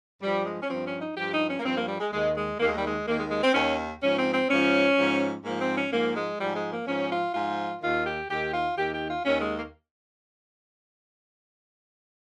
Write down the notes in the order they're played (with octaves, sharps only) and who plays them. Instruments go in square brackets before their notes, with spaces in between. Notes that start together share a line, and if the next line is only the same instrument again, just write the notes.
[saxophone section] G2 F3 G3
G#3
C#4
G2 F3 C4
C#4
D#4
G2 F3 G4
D#4
C#4
A#3
G2 F3 C4
A#3
G3
G#3
D#2 D#3 G#3
G#3
D#2 D#3 A#3
G#3
G3
G#3
D#2 D#3 A#3
G#3
G#3
C4
D#2 D#3 C#4
G#2 F3 C#4
C4
C4
G#2 F3 C#4
G#2 F3
G#2 F3 A#3
C4
C#4
G#2 F3 A#3
G#3
G#2 F3 G3
G#3
A#3
G#2 F3 C#4
F4
G#2 F3 F4
D#2 D#3 F4
G4
D#2 D#3 G4
F4
D#2 D#3 G4
G4
F4
D#2 D#3 C#4
G#3
A#3